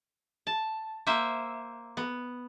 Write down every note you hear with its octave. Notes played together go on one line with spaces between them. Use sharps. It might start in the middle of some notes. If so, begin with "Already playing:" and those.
A5
A#3 C5 E5
B3